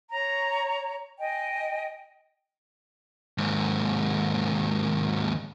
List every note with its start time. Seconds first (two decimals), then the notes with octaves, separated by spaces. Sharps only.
0.11 C#5 A#5
1.19 D#5 G5 G#5
3.38 D#2 G#2